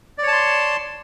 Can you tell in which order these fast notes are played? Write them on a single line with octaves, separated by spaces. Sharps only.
D5 C#5 A5 C6